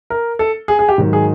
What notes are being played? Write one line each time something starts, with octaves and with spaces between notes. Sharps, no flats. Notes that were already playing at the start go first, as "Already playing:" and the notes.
A#4
A4
G#4
G#4
G4
G#2 D#3 F#3
G#4